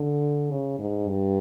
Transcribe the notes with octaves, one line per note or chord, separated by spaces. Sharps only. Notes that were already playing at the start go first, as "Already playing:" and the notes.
Already playing: D3
C#3
G#2
G2